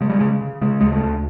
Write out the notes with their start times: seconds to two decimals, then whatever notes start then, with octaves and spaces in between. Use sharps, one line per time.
0.01 C#3 G#3
0.09 G3
0.19 C#3 G#3
0.41 C#3
0.61 C#3 G#3
0.81 D2 G#3
0.92 A3
1.03 D2